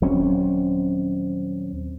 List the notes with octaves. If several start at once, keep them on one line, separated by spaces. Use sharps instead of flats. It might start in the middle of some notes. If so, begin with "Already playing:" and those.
D#1 F#3 C4 C#4